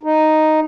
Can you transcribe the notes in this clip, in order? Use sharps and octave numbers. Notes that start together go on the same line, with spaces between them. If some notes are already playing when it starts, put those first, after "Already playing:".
D#4